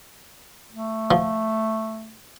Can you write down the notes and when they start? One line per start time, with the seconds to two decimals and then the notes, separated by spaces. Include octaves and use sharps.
0.72 A3
1.11 F3